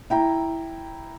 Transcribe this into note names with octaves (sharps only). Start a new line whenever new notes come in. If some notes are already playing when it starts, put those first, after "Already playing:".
E4 G5 A#5